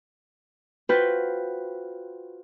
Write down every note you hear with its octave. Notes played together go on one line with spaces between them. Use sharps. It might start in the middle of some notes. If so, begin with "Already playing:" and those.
F4 F#4 B4 C5 G5